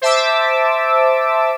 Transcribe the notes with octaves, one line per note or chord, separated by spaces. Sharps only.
C5 E5 A5 D6 E6